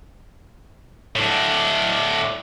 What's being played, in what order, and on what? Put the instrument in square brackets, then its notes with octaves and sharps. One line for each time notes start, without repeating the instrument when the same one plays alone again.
[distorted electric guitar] A2 D4